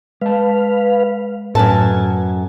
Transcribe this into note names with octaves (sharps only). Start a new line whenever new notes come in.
G#3 B4 F5 A5
F#2 A2 A4 B4 G#5 A5